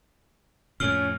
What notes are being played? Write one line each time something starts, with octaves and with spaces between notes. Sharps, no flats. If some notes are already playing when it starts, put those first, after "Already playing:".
F2 A2 C#4 F6